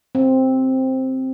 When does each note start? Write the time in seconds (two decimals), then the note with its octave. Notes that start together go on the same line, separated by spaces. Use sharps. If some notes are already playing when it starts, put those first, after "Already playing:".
0.15 C4